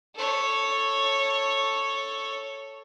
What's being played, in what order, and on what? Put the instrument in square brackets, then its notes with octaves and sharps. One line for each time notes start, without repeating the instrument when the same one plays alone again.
[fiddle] A4 C#5